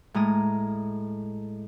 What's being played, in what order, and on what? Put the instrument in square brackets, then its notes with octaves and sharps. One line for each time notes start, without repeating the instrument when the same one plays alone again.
[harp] A2 G#3 A#5 D#6 F6